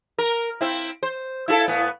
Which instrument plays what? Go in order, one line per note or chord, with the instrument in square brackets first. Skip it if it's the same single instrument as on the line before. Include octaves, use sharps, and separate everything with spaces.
[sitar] A#4
C4 E4
C5
E4 F4 A4
A2 B3